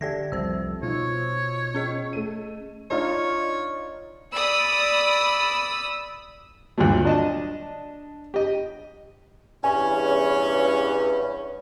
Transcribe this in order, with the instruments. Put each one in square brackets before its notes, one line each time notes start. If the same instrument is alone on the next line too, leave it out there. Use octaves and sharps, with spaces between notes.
[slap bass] D3 [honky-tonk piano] G4 A4 E5 [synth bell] D5 G#6 A#6
[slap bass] F1 C2 F3 [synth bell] C5 E6
[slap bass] B2 [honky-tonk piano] D#4 F4 [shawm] C#5
[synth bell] C#4 G#4 D#5
[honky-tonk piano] A3 D#7
[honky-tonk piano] D4 D#4 F4 [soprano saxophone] C#5
[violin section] D5 B5 D#6 E6
[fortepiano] D2 G2 A#2 F#3 A3
D4 D#5 A5
G4 D#5
[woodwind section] E2 G2 [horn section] C#4 [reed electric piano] G#5